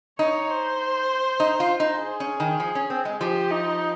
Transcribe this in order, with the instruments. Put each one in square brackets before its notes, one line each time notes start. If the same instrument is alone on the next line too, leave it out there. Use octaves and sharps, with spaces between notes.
[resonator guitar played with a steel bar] D#4 [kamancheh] C#5
[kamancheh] C5
[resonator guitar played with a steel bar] D#4
F4
D#4
[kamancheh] G#4
[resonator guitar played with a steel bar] C#4
D#3
F3
C#4
C4
G#3
[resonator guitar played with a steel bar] F3 [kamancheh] G4
[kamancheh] D#4